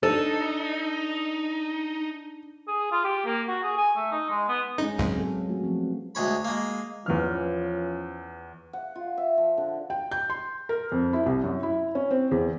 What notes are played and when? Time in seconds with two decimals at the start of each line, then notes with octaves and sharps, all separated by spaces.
0.03 D4 D#4 A4
2.68 G#4
2.92 F4
3.04 G4
3.26 A#3
3.48 F#4
3.63 G#4
3.77 G#5
3.96 A3
4.12 D#4
4.30 G#3
4.48 B3
4.78 G#3 C#4 D#4 G#4
4.98 C#2 G#2 F#3 C4 F5
5.18 B3 A4
5.49 A3 F#4
5.64 F3 B3 C4
6.15 D2 G#3 C#5 B5
6.45 G#3 A#3
7.06 E2 E3 F3 C#4 F4 F6
8.73 F#5
8.96 F4
9.18 E5
9.38 F3
9.58 D3
9.90 G5
10.11 G6
10.30 C6
10.69 A#4
10.92 F2
11.13 E4
11.26 C2
11.44 F#2
11.63 E4
11.95 C#4
12.11 C4
12.31 E2